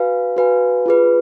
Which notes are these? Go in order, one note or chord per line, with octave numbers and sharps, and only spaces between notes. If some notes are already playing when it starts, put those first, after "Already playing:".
Already playing: F#4 B4 F5 G#5
F#4 B4 F5 G#5
F4 G#4 B4